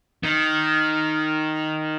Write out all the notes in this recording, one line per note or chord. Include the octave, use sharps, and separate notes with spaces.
D#3